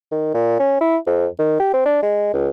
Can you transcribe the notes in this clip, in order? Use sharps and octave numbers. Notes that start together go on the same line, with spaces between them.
D#3
A#2
C#4
E4
F2
D#3
G4
C4
D4
G#3
C#2